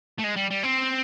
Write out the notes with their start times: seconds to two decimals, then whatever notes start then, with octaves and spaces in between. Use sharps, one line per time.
0.19 A3
0.24 G#3
0.37 G3
0.51 G3
0.64 C4